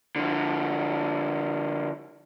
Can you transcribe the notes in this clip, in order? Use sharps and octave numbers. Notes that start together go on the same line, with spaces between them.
D3 F3